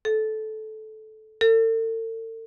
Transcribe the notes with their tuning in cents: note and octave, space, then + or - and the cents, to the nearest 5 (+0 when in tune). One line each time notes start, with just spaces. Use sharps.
A4 -15
A4 +40